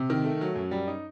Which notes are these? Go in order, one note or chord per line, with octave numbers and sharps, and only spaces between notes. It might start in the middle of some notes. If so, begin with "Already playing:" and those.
Already playing: C3
D#3
A3
F#3
F#2
G3
D#4